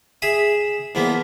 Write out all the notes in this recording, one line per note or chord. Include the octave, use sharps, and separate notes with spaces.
G#4 E5 D#6
E2 F3 A#3 B3